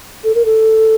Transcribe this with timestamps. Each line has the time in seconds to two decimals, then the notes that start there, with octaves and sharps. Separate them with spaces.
0.24 A4
0.35 A#4
0.45 A4